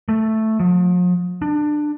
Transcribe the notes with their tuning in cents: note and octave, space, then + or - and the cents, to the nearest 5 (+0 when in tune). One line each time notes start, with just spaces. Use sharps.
A3 +0
F3 +45
D4 +20